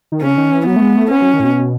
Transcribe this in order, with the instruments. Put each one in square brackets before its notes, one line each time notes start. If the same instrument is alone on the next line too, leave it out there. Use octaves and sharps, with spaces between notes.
[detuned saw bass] D#3
[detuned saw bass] C#3 [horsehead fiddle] C#4
[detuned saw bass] D#3
E3
[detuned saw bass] F#3 [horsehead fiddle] B3
[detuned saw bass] A3
G#3
A3
[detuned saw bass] B3 [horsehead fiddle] C#4
[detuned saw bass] F#3
D#3
A2
B2